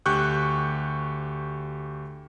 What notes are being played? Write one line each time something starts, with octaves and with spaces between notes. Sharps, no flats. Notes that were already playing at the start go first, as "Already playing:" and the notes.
D2 G4 C#6 F#6 G6